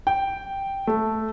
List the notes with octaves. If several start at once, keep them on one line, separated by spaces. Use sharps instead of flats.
G5
A3